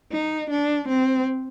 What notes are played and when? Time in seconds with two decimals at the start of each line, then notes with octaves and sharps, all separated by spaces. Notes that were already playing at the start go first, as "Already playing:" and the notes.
0.12 D#4
0.50 D4
0.88 C4